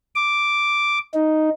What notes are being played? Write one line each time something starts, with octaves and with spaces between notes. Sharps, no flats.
D6
D#4